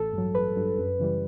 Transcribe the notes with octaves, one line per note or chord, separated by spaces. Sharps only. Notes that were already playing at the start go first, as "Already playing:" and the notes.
Already playing: A1 A4
G2 F#3
A1 B4
G2 F#3
F#2
C#3 E3 G3